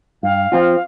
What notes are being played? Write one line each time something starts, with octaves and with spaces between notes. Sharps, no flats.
G2 F5
F3 C4 F4